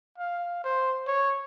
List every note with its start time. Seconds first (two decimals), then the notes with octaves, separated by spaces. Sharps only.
0.18 F5
0.64 C5
1.07 C#5